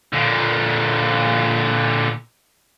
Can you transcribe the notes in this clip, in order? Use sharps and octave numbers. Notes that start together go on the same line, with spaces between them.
A#2 D3